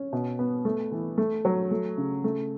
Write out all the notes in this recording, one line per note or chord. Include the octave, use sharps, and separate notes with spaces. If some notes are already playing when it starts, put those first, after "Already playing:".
Already playing: C#4
B2
B3
A3
E3
A3
F#3
A3
C#3
A3